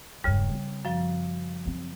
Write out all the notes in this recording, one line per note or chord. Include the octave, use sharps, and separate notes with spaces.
E1 G2 C#3 G3
C4
F#2 F3
F#3 C4